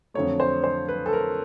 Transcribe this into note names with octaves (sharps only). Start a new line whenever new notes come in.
F2 D3 F#3 A3 C#5
C5
C5
B4
A4
A#4